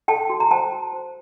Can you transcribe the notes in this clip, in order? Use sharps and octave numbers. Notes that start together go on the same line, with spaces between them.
A4 G5 A5
F#4
A#5
C5 G5 A5
F#4
C5